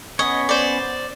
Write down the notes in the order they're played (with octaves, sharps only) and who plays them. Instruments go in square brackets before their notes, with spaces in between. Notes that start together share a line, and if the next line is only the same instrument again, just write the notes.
[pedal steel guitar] B3 C#4 C#5 [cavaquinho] D#5
[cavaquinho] C5 D5